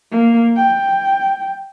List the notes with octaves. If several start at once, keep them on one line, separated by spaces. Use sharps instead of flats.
A#3
G5